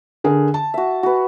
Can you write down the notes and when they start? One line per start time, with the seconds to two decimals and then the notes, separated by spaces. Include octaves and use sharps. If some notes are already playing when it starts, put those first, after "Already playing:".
0.24 D3 G#4 A#4
0.54 A5
0.74 F#4 E5
1.03 F#4 B4